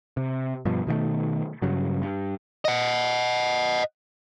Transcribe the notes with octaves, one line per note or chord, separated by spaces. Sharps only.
C3
G2 B2 F3
B2 D#3 F3 A3
G2 C#3 F#3
G2
D#5 F#5